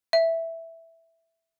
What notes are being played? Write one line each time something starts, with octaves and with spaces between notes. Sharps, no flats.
E5